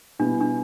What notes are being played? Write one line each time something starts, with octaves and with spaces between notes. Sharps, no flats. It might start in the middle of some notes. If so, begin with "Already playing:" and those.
B2 G3 B3 D4 E4
D4